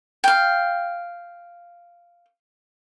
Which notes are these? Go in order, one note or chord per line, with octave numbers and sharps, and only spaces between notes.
F5 G5